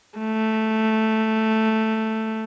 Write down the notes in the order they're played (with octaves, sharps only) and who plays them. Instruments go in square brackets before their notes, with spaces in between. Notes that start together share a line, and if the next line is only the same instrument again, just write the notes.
[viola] A3